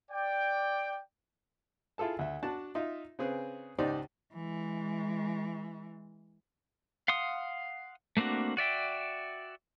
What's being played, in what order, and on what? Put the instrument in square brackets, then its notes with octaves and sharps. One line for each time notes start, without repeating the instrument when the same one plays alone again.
[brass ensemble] D5 G5
[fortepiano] E4 F4 G#4 A4 A5
D2 E5
D4 F#4 A5
D#4 F4 E5
C#3 C4 G#4 B4
C#2 G#2 D#4 G4 C5 D5
[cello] E3 G#3
[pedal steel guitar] F5 F#5 C6 D#6
A3 A#3 C4 D4 F#4
F#4 D5 E5 G5